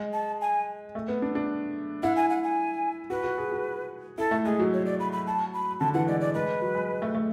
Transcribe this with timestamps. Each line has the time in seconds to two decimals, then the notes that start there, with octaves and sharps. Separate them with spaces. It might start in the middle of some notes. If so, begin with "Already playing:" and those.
Already playing: G#3
0.13 A5
0.41 G#5
0.95 A3
1.08 B3
1.22 D4
1.35 D4
2.03 E4 F#5
2.16 G#5
2.30 F#5
2.43 G#5
3.10 F#4 B4
3.24 F#4
3.38 G#4
3.52 F#4
4.18 E4 A4
4.31 A3
4.45 G#3 G#4
4.59 F#3
4.73 C#5
4.86 D5
5.00 B5
5.12 B5
5.27 A5
5.53 B5
5.80 D3 A5
5.94 E3 F#5
6.07 G#3 D5
6.20 D5
6.34 G#3 B4
6.62 F#3
6.74 G#3
7.02 A3
7.15 A3